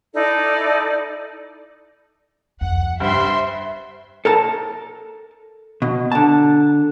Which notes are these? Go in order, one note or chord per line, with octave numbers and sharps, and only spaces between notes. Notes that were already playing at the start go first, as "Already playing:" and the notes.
D#4 E4 A4 D5
F2 F#5
G2 C5 E5 C6
A4 A#4 A5
B2
D3 A5